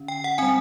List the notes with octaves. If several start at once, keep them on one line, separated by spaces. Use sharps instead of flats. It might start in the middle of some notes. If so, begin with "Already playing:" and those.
Already playing: D3 C#4
G5
F#5
G3 C4 G#5